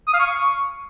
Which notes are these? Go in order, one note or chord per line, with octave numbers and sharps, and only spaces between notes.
D#6
F5
C#6